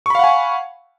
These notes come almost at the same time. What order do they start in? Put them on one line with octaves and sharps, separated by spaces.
C#6 B5 F5 F#5 G#5